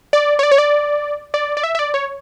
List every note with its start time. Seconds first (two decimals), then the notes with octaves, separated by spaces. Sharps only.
0.13 D5
0.39 C#5
0.43 D5
0.51 C#5
0.58 D5
1.34 D5
1.57 D5
1.63 E5
1.75 E5
1.79 D5
1.94 C#5